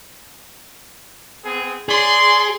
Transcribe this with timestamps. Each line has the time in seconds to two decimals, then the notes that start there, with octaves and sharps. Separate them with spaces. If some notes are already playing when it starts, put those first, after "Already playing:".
1.44 B3 C4 G#4
1.89 G#4 C#5 D5 C6